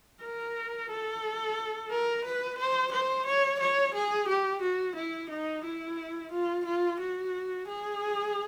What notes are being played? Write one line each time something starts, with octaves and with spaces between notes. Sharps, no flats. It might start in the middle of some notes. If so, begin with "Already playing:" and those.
A#4
A4
A#4
B4
C5
C5
C#5
C#5
G#4
G4
F#4
E4
D#4
E4
F4
F4
F#4
G#4